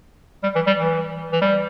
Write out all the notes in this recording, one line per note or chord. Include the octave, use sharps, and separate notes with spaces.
G3
E3
G3
E3
E3
G3